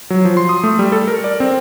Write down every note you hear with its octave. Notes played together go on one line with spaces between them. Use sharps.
F#3
F3
C6
D#6
A3
G3
A4
A#4
D5
C4